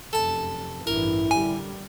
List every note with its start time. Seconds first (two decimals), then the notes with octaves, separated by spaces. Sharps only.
0.13 F1 F#2 A4 A5
0.87 A1 G2 E3 E4 A#4
1.31 D3 G3 G#5